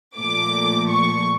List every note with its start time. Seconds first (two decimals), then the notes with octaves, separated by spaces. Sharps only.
0.17 A#2 F3 A3 D6
0.90 C#6